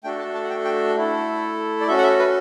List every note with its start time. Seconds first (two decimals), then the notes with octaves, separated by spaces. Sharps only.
0.04 A3 D4 F#4 A4 G5
0.19 A5
0.34 A5
0.44 F#5
0.50 G5
0.65 G5
0.95 A3 E4 A4
1.81 D5
1.87 C#4 F#4 A4 E5
1.98 F#5
2.03 E5
2.19 B4